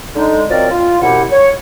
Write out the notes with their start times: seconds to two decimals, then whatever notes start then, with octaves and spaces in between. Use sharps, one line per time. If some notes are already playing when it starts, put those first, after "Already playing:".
0.16 D3 G#3 D#4
0.50 F3 F#3 C4 A#4 D5 D#5
0.71 F4
1.02 C2 F#2 B2 E4 G4 F#5
1.32 C#5